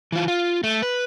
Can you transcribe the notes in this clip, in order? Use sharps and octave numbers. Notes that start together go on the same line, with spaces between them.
E3 F4
F4
A3
B4